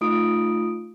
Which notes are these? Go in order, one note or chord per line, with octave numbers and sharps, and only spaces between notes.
A3 D#4 F4 D#6 D7